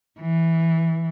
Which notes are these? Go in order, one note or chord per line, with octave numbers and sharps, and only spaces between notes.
E3